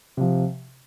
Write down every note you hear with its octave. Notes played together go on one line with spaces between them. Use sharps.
C3 F3